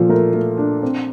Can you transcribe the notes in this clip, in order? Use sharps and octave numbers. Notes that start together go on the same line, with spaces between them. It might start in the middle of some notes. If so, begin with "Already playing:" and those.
Already playing: A#2 F3 A4
A3 A#4
A3
D4
C4